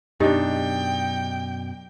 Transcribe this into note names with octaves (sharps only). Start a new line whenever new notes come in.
F#2 B2 D4 D#4 F#4 G4 D#5 G5